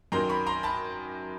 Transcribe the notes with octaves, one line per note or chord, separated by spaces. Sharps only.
F#2 D#3 F#3 A#5 C6
B5 C#6
A#5 C6
A5 B5